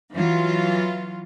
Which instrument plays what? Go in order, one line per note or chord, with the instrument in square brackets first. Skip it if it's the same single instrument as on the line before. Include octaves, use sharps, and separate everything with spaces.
[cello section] E3 F#3 F4